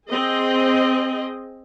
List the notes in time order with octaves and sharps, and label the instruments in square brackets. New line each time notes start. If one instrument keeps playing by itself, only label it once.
[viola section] C4 G#4 D#5